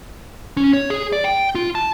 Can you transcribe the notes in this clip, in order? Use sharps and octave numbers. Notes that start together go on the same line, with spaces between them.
C#4
C#5
G#4
D5
G5
F4
A5